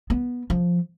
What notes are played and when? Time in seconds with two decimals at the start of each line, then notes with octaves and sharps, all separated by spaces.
0.10 B3
0.50 F3